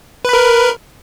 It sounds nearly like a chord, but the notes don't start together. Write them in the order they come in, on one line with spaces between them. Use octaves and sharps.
B4 B5 A#4